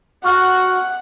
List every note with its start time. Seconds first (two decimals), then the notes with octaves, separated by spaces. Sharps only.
0.24 F#4 F#5 C#6 F6